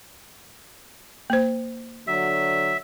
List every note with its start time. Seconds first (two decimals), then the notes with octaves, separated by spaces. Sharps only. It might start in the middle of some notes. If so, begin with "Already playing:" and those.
1.30 A#3 C5
2.07 D3 F#3 E5